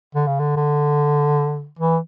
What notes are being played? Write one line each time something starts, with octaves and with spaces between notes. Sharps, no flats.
D3
C#3
D3
D3
E3